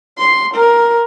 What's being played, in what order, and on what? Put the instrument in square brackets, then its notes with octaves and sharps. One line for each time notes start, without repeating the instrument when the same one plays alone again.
[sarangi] C6
A#4